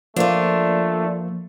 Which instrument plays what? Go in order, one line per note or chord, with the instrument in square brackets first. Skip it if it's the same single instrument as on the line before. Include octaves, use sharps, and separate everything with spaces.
[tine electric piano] F3 A#3 [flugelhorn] A3 [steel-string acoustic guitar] D4 F4